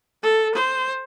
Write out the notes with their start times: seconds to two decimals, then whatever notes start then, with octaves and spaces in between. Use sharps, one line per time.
0.23 A4
0.54 C5